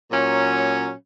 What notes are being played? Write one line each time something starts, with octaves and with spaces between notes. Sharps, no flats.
A#2 F#3 C#4